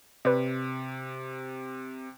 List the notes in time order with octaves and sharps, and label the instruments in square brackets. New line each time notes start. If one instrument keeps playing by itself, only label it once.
[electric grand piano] C3 [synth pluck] B4 D5